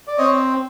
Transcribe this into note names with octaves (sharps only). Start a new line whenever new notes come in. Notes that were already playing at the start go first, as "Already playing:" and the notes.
D5
C4 C#5 D#5